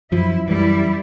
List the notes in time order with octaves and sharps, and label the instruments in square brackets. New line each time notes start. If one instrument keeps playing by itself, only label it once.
[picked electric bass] F#2 F3 [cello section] E4
[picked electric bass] F#2 E3 [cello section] G3 E4